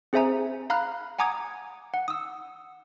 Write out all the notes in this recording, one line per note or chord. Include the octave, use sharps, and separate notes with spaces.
C4 G#4 C5 E5 G#5 A#5
F5 A#5 B5 F6 F#6
F#5 G#5 A#5 D6 D#6 G#6
F#5
D#6 E6